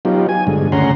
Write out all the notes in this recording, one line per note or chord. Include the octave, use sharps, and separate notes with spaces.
F#3 B3 D#4 F4 G4
G#5
G2 D3 G#3
D2 C#3 C#4 F#5 A#5 C6